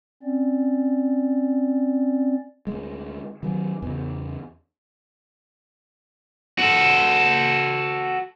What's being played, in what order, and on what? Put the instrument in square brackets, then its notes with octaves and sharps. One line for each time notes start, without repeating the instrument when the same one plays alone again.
[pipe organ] C4 C#4 D5
[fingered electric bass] D2 G#3
D#3 F#3
E2 C#3
[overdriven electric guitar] F#4 A4